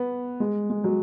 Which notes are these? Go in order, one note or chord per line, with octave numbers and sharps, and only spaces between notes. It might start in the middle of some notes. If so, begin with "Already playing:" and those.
Already playing: B3
G#3
G#3
F#3